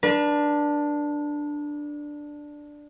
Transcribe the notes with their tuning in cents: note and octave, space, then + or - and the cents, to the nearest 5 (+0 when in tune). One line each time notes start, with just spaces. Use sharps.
D4 +5 B4 -40